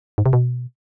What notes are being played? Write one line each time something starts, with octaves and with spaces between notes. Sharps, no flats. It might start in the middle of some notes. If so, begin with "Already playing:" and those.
G#2
C3
B2